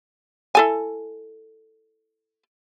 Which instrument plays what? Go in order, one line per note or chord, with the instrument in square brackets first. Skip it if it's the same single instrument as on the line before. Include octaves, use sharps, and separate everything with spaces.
[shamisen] E4 A4 G#5